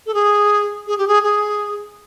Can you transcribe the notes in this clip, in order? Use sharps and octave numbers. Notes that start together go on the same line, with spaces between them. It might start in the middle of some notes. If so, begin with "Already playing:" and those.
A4
G#4
G#4
G4
G#4
G#4